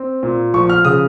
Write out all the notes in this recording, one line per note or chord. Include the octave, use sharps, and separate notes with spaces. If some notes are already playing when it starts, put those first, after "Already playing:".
Already playing: C4
A#2
F3 C#6
F6
C#3 D#6